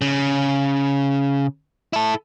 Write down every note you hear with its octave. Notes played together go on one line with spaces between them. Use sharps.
C#3
E4 A4